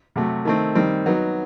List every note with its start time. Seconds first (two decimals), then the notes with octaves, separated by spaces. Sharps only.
0.16 C3 F#3 A3
0.45 D#3 A3 C4
0.75 D#3 G3 C4
1.06 F#3 B3 D#4